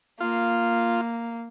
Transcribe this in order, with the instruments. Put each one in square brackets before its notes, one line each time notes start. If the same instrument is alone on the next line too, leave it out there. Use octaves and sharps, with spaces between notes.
[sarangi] A#3 [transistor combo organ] F4